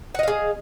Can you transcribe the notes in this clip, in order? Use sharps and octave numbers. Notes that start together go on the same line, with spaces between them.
G#4 D#5 F5 F#5